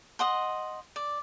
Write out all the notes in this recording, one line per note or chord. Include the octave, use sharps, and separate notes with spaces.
D#5 F#5 C6
D5